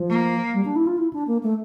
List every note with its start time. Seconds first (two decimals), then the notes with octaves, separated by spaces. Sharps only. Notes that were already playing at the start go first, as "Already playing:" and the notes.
Already playing: F3
0.09 A#3
0.53 G3
0.65 D4
0.76 E4
0.87 F4
0.98 E4
1.13 D4
1.27 A#3
1.43 A3